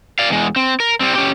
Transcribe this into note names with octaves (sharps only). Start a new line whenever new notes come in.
D5 F5
E2 G#3
C4
A#4
G3 C4
C#4 G4